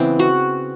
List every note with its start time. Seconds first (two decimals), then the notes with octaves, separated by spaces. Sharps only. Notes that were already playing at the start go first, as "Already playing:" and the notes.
Already playing: C#3 E3 G#3 B3 C4
0.19 F#4